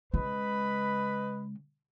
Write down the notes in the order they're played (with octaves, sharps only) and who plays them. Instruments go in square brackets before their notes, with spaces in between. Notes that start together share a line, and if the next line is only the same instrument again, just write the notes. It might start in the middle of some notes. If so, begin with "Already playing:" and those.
[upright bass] C#3 G#3 [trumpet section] B4 D#5 B5